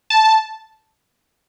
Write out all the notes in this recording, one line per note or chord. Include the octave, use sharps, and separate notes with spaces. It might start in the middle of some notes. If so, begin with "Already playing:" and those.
A5